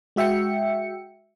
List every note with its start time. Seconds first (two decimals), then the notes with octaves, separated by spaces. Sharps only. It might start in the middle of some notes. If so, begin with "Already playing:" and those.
0.16 G#3 F#4 E5 G5 C#7